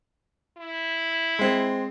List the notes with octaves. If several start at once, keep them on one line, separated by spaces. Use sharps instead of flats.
E4
G#3 C4